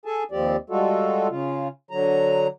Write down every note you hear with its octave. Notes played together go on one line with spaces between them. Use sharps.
G#4 A4 G#5 A5
D#2 F3 C4 G4 D5
G3 G#3 F4 F#4 A4
C#3 F4
D3 F#3 A#5